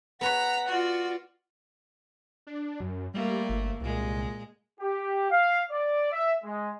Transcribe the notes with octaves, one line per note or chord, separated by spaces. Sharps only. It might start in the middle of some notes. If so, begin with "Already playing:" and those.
B3 B4 C#5 F#5 A#5 B6
F4 F#4 D5
D4
F#2
G3 A3 A#3
G1
C2 A#2 G#3
G4
F5
D5
E5
G#3